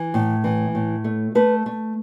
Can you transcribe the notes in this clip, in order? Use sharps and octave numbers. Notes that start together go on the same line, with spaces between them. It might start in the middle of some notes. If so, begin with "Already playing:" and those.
Already playing: E3
A2
E3
A2
A3
A3 B4
A3